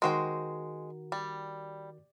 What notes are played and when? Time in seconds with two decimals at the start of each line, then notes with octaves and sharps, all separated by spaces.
0.02 D#3 G#3 F#4 A#4 C5 G5
1.12 G3